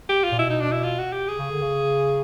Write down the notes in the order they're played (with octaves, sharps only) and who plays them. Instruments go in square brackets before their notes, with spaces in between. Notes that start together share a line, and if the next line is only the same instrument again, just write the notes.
[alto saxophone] G4
F4
[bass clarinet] A#2
[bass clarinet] B2 [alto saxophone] E4
[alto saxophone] D#4
D4
E4
F4
F#4
G4
G#4
[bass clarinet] C#3
D3
C#3